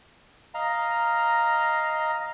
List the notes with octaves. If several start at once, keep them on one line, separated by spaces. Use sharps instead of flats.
D#5 F5 A#5